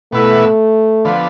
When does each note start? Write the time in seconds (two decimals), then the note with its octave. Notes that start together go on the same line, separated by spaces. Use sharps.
0.13 B2 A3 B3 E4
1.05 D3 F3 B3